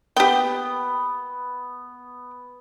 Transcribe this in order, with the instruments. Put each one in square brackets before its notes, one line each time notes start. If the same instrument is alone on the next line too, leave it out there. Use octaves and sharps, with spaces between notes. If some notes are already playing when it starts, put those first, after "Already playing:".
[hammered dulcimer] B3 [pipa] G4 G5